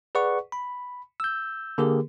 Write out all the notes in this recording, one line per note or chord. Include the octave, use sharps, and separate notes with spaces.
G#4 B4 D5 F#5 C#6
B5
E6 G6
D3 A#3 G4 G#4 A#4